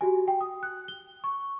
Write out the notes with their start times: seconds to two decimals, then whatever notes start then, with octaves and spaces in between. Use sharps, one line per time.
0.01 F#4 G4 G#5
0.28 G5
0.41 D#6
0.63 F#6
0.88 G7
1.24 C#6